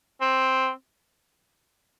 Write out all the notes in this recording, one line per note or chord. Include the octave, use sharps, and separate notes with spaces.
C4